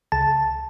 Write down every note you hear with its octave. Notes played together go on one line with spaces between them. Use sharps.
C#2 A5